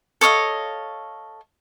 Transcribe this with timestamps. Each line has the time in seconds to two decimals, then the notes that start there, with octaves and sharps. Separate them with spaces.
0.21 A4 C#5 D#5 F5